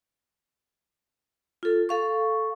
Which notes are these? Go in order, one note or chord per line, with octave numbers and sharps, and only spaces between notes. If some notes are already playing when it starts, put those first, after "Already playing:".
F4 A4
A4 F5 C#6